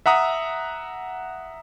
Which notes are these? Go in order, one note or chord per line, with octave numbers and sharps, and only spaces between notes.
E5 F#5 A#5 D#6